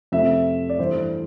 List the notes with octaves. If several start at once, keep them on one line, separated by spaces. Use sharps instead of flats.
F2 C3 F3 A3 E5
D5
G2 E3 A3 C5